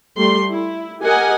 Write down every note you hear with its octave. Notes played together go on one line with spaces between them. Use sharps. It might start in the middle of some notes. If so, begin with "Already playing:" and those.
G3 A3 C6
E4
G4 A#4 D#5 F#5 G#5